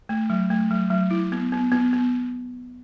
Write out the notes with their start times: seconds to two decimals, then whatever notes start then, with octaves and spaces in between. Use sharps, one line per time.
0.09 A3
0.30 F#3
0.50 A3
0.71 F#3
0.90 F#3
1.11 E4
1.32 B3
1.52 B3
1.72 B3
1.93 B3